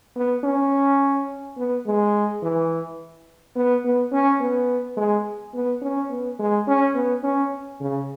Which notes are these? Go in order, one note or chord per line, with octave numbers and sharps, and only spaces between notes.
B3
C#4
B3
G#3
E3
B3
B3
C#4
B3
G#3
B3
C#4
B3
G#3
C#4
B3
C#4
C#3